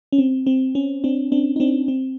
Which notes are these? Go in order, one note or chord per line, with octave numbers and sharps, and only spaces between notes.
C#4
C4
C4
C#4
C4 D4
C4 D4
D#4
C4 D4
C4